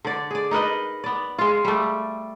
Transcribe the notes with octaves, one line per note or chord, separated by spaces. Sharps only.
D3 D5
G#4 D5
D#4 A#4 B4 D#5
B3 D5
G#3 F4
G3 A3